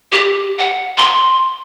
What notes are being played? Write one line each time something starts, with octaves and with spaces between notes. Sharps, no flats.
G4
F#5
C6